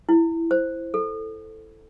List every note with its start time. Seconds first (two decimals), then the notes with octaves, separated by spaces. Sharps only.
0.09 E4
0.51 C5
0.94 A4